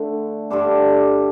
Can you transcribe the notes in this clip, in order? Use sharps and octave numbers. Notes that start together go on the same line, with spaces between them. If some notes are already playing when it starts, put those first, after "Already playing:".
Already playing: D3 A3
G2 D3 G3 D4